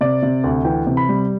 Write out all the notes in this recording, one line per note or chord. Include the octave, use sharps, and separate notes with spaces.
C3 D5
C3
D2
E3 G5
C3
B5
G3